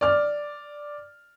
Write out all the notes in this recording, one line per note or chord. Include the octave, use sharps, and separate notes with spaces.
D5 F6